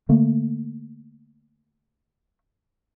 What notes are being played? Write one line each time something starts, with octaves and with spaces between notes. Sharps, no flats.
D3 A3 A#3